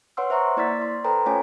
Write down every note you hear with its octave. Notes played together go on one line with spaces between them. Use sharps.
B4 C#5 F#5 C6 E6
C5 E5 F#5 A#5 C6 C#6
A#3 E4 D5 F6 A6 B6
C6
A4 B4 C5 G5 A#5 B5
A3 C#4 F4 C#5 G5 G#5